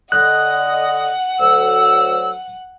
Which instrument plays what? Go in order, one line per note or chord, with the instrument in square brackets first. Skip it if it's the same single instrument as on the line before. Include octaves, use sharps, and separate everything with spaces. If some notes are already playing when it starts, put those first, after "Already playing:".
[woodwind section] D3 D#5 [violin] F#5 [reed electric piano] F#6
[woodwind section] D2 F#3 E6